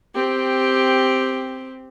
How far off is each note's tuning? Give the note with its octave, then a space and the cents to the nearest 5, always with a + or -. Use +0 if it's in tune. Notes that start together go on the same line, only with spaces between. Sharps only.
C4 -5 G4 +5